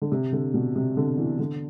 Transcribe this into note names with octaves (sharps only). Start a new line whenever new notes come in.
D3
C3
D3
B2
C3
D3
E3
D3